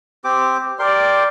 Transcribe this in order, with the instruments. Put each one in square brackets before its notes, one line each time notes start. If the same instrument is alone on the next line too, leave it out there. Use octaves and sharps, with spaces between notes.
[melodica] C4 G4 D6
[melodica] G4 A#4 C6 [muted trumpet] D5